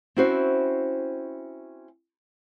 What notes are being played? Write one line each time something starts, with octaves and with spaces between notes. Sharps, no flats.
C4 C#4 E4 F#4 C5